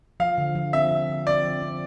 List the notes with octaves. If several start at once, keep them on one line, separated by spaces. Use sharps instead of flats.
F3 F5
D3
F3
C4 E5
C4
D3
C4 D5
F3
C4